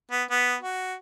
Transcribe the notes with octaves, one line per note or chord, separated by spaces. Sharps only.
B3
B3
F#4